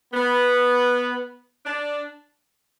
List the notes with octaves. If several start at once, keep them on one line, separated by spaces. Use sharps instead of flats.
B3
D4